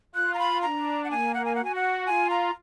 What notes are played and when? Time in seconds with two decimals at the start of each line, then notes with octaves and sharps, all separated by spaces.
0.15 F4 F#6
0.34 A#5
0.39 B5
0.62 D4 A#5
1.04 F#5
1.11 A#3 G#5
1.34 F#5
1.45 G#5
1.55 F#4 F#5
1.65 G#5
1.75 F#5
2.06 F4 G#5
2.30 A#5